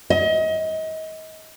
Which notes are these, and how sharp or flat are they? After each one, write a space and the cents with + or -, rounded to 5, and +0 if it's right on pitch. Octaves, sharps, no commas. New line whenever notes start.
D#5 +30